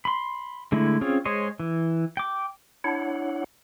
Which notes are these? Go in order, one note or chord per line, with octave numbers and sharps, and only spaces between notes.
B5 C6
D3 G#3 A3 E4
C4 C#4 F4 G#4
G#3 G#4 C5 C#5 D#5
E3
G5 D6
D4 E4 C#5 F#5